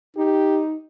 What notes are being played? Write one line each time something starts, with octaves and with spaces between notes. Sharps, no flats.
D#4 G4